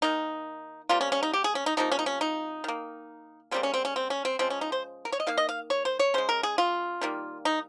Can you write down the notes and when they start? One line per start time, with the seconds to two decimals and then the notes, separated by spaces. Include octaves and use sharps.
0.02 D#3 A#3 D#4
0.89 C3 G3 A#3 F4
1.01 C#4
1.12 C#4
1.23 D#4
1.33 G4
1.44 G#4
1.55 C#4
1.66 D#4
1.77 C3 F3 A#3 D#4
1.91 C#4
1.99 D#4
2.06 C#4
2.21 D#4
2.64 D#3 A#3
3.51 C#3 G3 A#3 C4
3.63 C#4
3.74 C4
3.85 C#4
3.96 C4
4.10 C#4
4.25 C4
4.39 C#3 F3 G#3 C4
4.50 C#4
4.61 D#4
4.72 C5
5.05 A#4
5.12 C#5
5.20 D#5
5.27 D#3 A#3 F5
5.37 D#5
5.49 F5
5.70 C#5
5.85 C5
5.99 C#5
6.14 C#3 G#3 C5
6.29 A#4
6.43 G#4
6.58 F4
7.01 D#3 G3 A#3
7.45 D#4